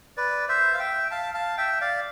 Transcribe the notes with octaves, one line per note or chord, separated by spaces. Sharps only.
B4 D5
C5 E5
F5
E5 G5
F5 A5
F5 A5
E5 G5
D5 F5